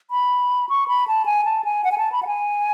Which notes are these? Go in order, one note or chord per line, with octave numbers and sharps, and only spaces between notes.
B5
C#6
B5
A5
G#5
A5
G#5
F#5
G#5
A5
B5
F#5
G#5